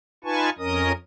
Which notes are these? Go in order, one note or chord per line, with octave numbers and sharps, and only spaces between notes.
D#4 F4 B4 G#5 A5 C#6
F2 C#4 A#4 D#5 D#6